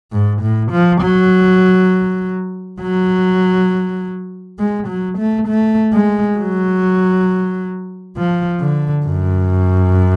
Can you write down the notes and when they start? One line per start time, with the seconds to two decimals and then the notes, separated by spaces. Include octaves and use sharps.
0.12 G#2
0.42 A2
0.71 F3
1.01 F#3
2.80 F#3
4.59 G#3
4.88 F#3
5.18 A3
5.48 A3
5.93 G#3
6.38 F#3
8.16 F3
8.60 D3
9.05 F#2